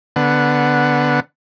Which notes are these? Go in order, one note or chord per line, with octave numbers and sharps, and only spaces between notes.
D3 B3 F#5